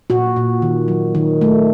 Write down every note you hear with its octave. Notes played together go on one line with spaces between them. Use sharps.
A#2 F#4
A#2
D#3
F#3
D#3
A3